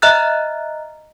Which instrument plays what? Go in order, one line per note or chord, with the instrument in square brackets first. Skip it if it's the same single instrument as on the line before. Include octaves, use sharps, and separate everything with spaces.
[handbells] D#5 E5 A#5 F6 F#6 A6